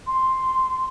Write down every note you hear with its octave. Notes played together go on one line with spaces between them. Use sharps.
C6